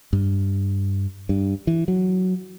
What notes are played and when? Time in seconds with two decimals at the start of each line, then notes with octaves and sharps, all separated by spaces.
0.13 G2
1.29 G2
1.67 E3
1.88 F#3